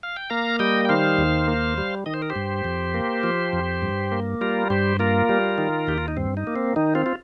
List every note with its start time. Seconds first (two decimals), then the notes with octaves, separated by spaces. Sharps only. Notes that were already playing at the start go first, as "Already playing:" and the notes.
0.03 F5
0.16 G5
0.30 A#3 F5 A#5
0.59 G3 D#5 G5
0.85 G5
0.89 D#3 C5 F5
1.18 D#2
1.48 A#3
1.78 G3
2.06 D#3 D#5
2.14 C5
2.22 A#4
2.30 G4 C5
2.36 G2
2.64 F2
2.94 A#3
3.23 F3
3.53 F2
3.82 G2
4.12 A#3
4.41 G3 F4 A#4
4.70 G2 G4 C5
4.99 A#3 F4 A#4
5.29 G3
5.58 D#3
5.87 D#2 G4
5.98 F4
6.08 D#4
6.17 G2 C4
6.37 D#4
6.47 A#3
6.56 C4
6.76 D#3 D#4
6.95 C4 F4
7.06 F4